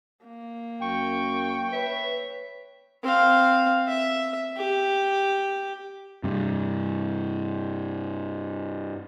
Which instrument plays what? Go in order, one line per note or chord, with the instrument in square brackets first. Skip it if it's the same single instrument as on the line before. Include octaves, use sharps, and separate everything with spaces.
[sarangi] A#3
[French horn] F#2 [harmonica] G5 [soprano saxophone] C#6
[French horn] B4 [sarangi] C#5 [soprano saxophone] E5
[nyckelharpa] C4 F5
E5
G4
[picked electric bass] G2 C3